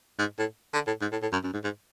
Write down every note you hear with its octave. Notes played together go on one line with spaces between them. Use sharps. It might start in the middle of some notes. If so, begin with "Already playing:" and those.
G#2
A2
D3
A2
G#2
A2
A2
F#2
F#2
G#2
G#2